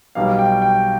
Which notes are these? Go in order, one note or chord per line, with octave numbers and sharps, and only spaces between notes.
B1 B2 G3 F5
G5
G5